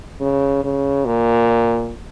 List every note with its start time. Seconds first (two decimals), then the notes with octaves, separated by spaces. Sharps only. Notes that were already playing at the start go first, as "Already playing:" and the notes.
0.21 C#3
0.64 C#3
1.05 A#2